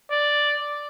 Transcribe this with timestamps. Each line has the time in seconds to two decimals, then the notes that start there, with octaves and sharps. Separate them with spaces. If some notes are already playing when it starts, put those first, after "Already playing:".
0.11 D5